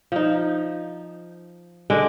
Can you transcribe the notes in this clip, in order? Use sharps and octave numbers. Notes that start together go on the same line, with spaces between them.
F3 D#4
D3 G#3 D4